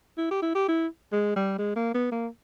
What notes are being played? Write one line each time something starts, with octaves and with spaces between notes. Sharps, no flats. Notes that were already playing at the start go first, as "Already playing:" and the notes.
E4
G4
E4
G4
E4
G#3
G3
G#3
A#3
B3
A#3